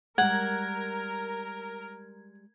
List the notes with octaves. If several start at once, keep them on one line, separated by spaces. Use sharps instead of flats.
G3 G#3 A#4 F#5 G#6